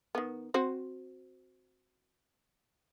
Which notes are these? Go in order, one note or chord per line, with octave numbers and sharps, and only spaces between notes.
D#3 B3
C4 F#4 C5